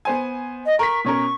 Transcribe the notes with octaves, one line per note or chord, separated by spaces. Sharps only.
B3 C5 G#5
D#5
A#4 C#6 B6
B2 C#4 A#4 C#6